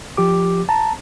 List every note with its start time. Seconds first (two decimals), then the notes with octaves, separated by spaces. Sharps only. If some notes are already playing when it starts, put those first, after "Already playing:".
0.17 F3 G4 D6
0.69 A5 A#5